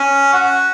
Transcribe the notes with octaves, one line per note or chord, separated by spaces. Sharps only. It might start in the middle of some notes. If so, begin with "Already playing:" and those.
Already playing: C#4
F#4